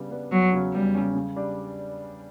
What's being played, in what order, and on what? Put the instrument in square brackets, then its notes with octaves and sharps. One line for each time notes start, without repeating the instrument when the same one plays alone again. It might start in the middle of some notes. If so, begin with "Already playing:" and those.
Already playing: [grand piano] C#3 G3 B3 D4
G3 B3 D4
[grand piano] E2 [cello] F#3
[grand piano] C#3 F#3 C#4
[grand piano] E2 [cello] G3
[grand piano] C#3 F#3 C#4
C#3
G3 D4